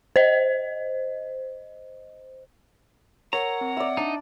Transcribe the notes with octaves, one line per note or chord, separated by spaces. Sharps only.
C5 D#5
A#4 C#5 F#5 A#5
C4
D5 E5 E6
D4 D#4 A5 A#5